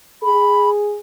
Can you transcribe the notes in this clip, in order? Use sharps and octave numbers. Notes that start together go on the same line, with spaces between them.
G#4 B5